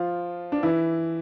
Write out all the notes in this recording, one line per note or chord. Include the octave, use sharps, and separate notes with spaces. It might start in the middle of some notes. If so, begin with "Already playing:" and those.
Already playing: F3 F4
D4
E3 E4